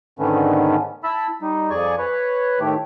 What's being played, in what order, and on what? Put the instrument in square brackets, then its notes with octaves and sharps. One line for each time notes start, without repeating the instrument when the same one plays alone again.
[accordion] G#2 D3 D#3 A3 B3 C#4
E4 A5 B5 E6
G3 D#4
F2 G#4 D5 G#5 C#6
B4 C#5
A2 D#3 A3 G4